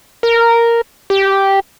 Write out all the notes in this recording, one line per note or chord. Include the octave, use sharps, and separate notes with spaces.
A#4
G4